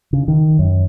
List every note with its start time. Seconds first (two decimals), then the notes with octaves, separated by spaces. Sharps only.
0.13 C#3
0.28 D#3
0.59 F#2